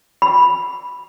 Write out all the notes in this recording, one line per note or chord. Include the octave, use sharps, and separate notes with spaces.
B5